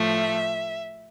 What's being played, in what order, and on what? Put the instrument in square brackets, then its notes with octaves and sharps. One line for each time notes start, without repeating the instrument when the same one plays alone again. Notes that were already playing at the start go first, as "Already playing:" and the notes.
Already playing: [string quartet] A2 F3 A3 E5